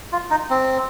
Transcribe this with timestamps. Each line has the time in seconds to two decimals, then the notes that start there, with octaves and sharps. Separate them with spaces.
0.12 F4
0.30 D#4
0.50 C4